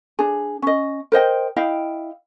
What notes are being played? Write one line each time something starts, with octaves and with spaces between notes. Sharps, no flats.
D4 G#4
C#4 D#5
A#4 C5 D#5 G5
E4 D#5 F5 G5